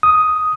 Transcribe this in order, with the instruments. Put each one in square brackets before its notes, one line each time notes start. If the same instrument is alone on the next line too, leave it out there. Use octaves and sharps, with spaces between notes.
[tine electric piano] D#6